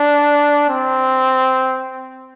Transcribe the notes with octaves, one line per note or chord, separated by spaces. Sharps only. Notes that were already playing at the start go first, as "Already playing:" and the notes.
Already playing: D4
C4